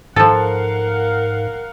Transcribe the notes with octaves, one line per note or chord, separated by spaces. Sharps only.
G#2 F3 A4 A#4 F5 F#5